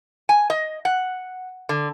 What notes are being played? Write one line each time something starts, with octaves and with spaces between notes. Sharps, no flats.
G#5
D#5
F#5
D3